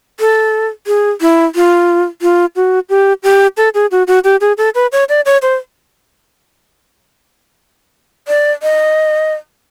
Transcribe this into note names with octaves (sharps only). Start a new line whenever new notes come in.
A4
G#4
E4
F4
F4
F#4
G4
G4
A4
G#4
F#4
F#4
G4
G#4
A4
B4
C#5
D5
C#5
C5
D5
D#5